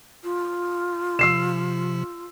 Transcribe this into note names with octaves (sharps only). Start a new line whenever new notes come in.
F4
C3 F3 E6 C7 E7